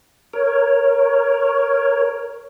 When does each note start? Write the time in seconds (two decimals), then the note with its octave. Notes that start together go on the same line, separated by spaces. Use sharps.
0.33 A#4 C#5